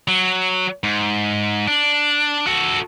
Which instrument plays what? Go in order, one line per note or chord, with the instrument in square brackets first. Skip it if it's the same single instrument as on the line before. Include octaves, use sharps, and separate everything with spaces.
[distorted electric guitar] F#3
G#2
D4
F#4 A4